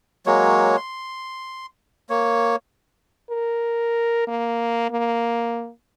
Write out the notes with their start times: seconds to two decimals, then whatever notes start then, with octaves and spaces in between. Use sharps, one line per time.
0.26 F#3 G#3 A#3 C#5
0.77 C6
2.10 A#3 C#5
3.30 A#4
4.27 A#3
4.90 A#3